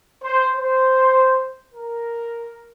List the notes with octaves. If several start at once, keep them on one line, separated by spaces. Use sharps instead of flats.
C5
C5
A#4